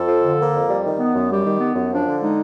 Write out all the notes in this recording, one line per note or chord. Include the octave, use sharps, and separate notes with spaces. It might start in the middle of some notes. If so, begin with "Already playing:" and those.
Already playing: F2 A4
F3
D3
A#3
F2
G3
D#3
B3
F#2
G3 G4
D#3
B3
F#2
F3 D4
D3
G#3 D#4